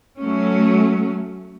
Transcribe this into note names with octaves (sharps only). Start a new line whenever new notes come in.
F#3 A3 C#4